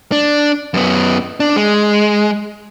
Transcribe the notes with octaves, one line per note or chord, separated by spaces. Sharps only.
D4
F#2 B3
D4
G#3